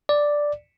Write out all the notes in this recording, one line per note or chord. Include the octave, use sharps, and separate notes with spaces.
D5